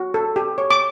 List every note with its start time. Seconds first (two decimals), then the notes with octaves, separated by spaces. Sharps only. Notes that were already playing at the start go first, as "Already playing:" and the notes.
Already playing: F#4
0.14 A4
0.36 G4
0.58 C#5
0.71 D6